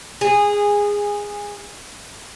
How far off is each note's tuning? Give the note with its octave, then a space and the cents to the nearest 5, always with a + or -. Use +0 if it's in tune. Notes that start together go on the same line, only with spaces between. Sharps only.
G#4 -15